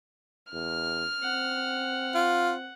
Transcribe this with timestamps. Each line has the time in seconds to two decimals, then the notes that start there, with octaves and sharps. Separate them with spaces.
0.52 E2 F6
1.23 C4 F#5
2.15 F4